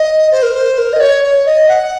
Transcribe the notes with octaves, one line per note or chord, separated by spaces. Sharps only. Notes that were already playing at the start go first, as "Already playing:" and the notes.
Already playing: D#5
C5
A#4
C5
A#4
D#5
C#5
C#5
D#5
F#5